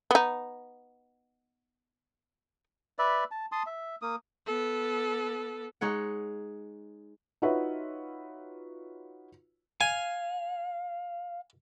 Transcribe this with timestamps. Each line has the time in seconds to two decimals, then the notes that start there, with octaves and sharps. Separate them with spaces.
0.11 B3 D#4
2.99 B4 D5 E5
3.31 A5
3.52 A5 C6 D#6
3.66 E5
4.02 A#3 D#6
4.46 B3 A4
5.81 G#3 D#4 C#5 F#5
7.42 D#4 F4 F#4 B4 C#5 E5
9.81 F5 G#5